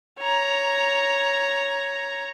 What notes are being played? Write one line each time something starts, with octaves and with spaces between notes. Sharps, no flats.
C#5 A#5